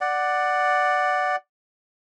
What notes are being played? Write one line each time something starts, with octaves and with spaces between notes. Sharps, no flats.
D5 F#5